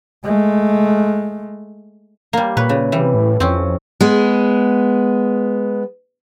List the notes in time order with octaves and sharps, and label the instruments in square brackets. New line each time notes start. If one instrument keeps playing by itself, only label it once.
[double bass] G#3 A3
[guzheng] G3 A#3
[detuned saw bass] A#2 [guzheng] B4 C#5
[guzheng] C#3
[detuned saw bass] C3 [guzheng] E3 G3
[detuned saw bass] A2
[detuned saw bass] F2 [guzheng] C4 C#4
[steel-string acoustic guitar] G#3 B3